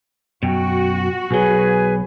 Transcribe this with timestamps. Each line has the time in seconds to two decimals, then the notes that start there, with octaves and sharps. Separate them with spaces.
0.43 F#2 B2 F#4 G5
1.31 B1 F#3 G#4 B4 G#5